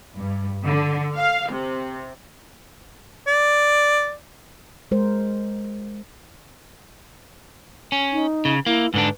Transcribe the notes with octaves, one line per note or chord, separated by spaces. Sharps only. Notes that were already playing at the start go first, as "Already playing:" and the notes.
G2
D3
F5
C3
D5
G#3 A#4 C5
C#4
D#4
C#3
A#3 E4
G#2 D3 D4 B4